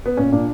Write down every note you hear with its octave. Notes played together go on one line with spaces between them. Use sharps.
B3
A#2 C#4
A#2 D4